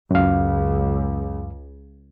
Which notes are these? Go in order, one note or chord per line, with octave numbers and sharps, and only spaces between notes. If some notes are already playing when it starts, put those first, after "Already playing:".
C#2 F#2 F5